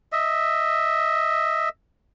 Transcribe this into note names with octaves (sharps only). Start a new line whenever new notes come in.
D#5 E5